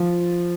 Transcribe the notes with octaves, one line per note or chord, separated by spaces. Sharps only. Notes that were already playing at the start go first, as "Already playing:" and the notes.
Already playing: F3 F4